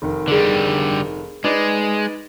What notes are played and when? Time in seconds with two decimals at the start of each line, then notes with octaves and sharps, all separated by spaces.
0.02 F1 D#3
0.28 D3 G3 G#4 A#4
1.44 G#3 D#4 B4 D5